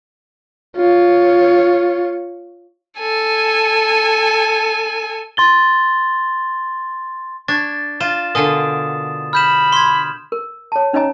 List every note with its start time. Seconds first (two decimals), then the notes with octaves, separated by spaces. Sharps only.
0.77 F4 C#5
2.99 A4 G#5
5.37 C6 A6 G7
7.48 D4 C#6 G#6 A6
8.01 F4 E7
8.35 B2 D3 A#4 F5 G#5 D#6
9.33 B5 F6 G6 E7
9.72 C6 G#6
10.32 A#4
10.72 C#5 A5
10.93 C#4 D#4 C#5 D#5 G#5 A#5